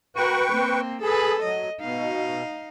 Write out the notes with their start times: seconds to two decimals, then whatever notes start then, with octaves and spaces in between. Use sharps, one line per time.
0.16 F#4 A#4 B4 G5 C#6
0.52 A#3 C4
1.02 G#4 A4 B4
1.42 F#3 D#5
1.80 B2 D#4 F5